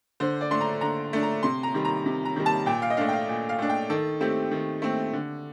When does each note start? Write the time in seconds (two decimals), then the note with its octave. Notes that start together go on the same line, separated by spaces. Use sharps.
0.20 D3 C5
0.41 D5
0.51 A3 D4 C6
0.61 A#5
0.81 D3 A#5
1.13 A3 D4
1.23 A#5
1.43 C3 C6
1.63 A#5
1.74 D#3 G3
1.85 A#5
2.06 C3
2.25 A#5
2.36 D#3 G3
2.46 A5
2.66 A#2 G5
2.82 F5
2.90 D#5
2.97 A3 D4 F5
3.08 G5
3.13 F5
3.28 A#2
3.49 F5
3.59 A3 D4
3.69 G5
3.90 D#3 A4
4.21 A3 C4 G4
4.51 D#3
4.82 A3 C4
5.13 D3